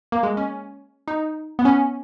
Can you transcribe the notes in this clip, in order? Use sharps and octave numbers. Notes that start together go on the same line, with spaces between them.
A#3
G#3
C#4
D#4
B3
C#4